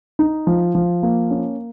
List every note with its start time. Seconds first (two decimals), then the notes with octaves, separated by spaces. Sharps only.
0.19 D#4
0.47 F3
0.75 F3
1.03 A#3
1.31 C#4